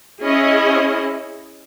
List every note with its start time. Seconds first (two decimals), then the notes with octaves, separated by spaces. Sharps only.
0.23 C#4 E4 G#4 D#5